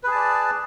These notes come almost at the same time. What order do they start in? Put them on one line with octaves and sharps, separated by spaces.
B4 G#4 A5 D5